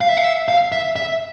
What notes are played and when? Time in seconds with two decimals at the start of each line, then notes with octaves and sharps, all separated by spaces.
0.01 F5
0.09 E5
0.17 F5
0.24 E5
0.48 F5
0.72 E5
0.96 E5